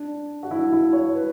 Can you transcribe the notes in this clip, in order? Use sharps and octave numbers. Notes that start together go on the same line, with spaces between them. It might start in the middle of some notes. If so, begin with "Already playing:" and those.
Already playing: D4
F#4
E4
E4
C#5
B4